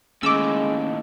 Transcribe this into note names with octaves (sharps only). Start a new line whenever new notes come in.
D#2 A2 G#3 C#4 D6 E6